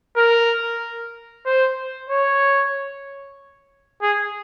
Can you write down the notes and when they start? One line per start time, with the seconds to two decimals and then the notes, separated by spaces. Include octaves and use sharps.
0.17 A#4
1.46 C5
2.09 C#5
4.02 G#4